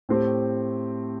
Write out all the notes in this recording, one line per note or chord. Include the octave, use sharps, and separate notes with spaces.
A2 A3 C4 G4